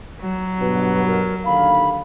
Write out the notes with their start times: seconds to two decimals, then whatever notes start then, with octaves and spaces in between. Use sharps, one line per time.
0.21 F#3
0.61 G2 B2 B4
1.07 A#4
1.46 D#2 D3 F5 B5